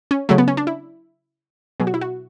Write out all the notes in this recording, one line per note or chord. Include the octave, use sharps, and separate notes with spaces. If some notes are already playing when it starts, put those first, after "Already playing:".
C#4
C#3 F#3 A3
B3
C#4
D4
E4
B2 F#3 G#4
F#4
E4
F#4